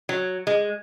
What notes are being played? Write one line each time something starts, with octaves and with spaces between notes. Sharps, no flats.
F#3
G#3